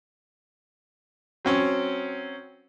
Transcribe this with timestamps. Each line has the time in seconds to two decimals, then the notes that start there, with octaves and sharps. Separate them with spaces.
1.45 F#3 C4 C#4